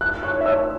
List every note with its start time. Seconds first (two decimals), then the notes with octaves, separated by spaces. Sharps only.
0.01 F#6
0.23 C#5 F#6
0.41 E5
0.45 C#5 E6